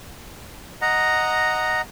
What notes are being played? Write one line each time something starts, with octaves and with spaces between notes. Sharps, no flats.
D#5 F#5 A#5